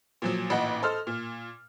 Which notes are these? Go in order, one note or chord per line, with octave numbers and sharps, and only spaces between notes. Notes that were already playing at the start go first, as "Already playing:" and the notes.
A#2 F3 F#3
A1 A#2 D#4 F#5
A4 C5 D#5 F6
A#2